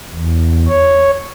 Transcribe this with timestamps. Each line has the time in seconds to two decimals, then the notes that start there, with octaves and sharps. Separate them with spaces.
0.12 E2
0.68 C#5